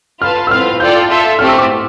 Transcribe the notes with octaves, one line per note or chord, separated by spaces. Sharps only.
F4 B4 F5 A5 F6
E6
C4 F4 B4 F5 F6
F4 A4 D5 G5 G6
F4 A4 E5
A3 C4 G4 F6
E6
D6